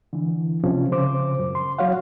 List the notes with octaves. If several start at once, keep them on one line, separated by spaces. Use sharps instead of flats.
D3 E3
C3 F3 C#4
C#3 C5 D6
F#2
C6
F#3 F#4 C#5 F5 F#5